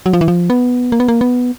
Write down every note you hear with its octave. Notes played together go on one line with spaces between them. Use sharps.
F#3
F3
E3
F3
B3
A#3
B3
A#3
B3